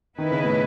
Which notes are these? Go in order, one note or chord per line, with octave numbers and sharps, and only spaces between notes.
D#3 B3 E4 B4 D#5
C#3
A2